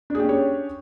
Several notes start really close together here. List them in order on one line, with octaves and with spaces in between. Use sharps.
D4 G#4 G4 C#4 C#5